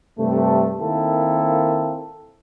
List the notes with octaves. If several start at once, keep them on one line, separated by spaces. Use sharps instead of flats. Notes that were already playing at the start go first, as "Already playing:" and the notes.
G2 C3 A3
D#3 A#3 C4 E4 A4